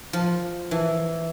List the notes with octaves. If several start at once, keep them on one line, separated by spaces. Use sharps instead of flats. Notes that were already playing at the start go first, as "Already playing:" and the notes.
F3
E3